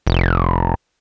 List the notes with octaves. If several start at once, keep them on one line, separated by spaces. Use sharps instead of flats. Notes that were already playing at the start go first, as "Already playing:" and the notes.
F1